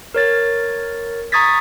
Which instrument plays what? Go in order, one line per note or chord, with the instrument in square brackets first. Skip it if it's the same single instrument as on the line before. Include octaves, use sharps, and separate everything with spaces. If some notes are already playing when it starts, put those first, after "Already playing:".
[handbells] A#4 C#5 A6
A#5 C#6 D#6 G#6 A6 B6